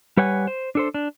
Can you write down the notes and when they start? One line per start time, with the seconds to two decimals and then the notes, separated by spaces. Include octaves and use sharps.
0.17 G3 B4 C#5 F#5 G#5
0.47 C5
0.75 D4 A4 C5
0.94 D4